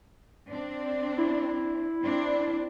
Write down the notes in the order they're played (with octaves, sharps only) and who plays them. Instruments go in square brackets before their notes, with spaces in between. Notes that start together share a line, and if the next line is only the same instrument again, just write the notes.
[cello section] C4 D4
[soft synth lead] E4
[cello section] C4 D4